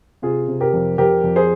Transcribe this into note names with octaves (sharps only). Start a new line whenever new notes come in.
C3 F4 G#4
C3
G4 A#4
F2
F2 G4 A#4
F2
G#4 C5